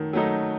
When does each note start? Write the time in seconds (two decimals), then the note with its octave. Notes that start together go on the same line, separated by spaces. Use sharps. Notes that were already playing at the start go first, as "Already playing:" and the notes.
Already playing: D#3 F#3 A3 D#4
0.13 F#3 A3 D#4